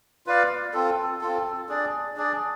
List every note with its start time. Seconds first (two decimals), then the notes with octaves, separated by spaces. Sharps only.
0.26 F4 B4 D5 F5
0.73 C4 F4 A4
1.21 C4 F4 A4
1.69 D4 G#4 D5
2.17 D4 G#4 D5